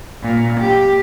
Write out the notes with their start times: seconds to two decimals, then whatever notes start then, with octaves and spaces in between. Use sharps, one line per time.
0.21 A#2
0.61 G4